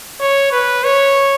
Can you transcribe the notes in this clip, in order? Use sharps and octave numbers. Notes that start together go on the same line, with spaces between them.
C#5
B4
C#5